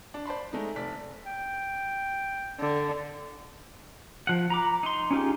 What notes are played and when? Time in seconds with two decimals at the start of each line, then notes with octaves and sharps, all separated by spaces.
0.14 D4
0.26 C5 D5 A5 B5 C6
0.53 G#3 A3 D#4
0.76 F1 D5 B6
1.26 G5
2.60 D3
4.27 F3 F#5
4.50 A#5 B5 D6
4.83 D#4 C6
5.11 C#4 D#4 F4 G4 G#4